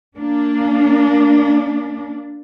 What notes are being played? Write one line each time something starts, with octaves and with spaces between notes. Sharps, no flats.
A#3 D4